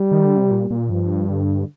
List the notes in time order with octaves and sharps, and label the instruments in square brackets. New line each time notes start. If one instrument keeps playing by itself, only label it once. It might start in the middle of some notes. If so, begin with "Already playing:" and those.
Already playing: [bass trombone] G3
[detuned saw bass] D#3
D3
C3
A#2
A#2
[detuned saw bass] G2 [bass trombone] F3
[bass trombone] D3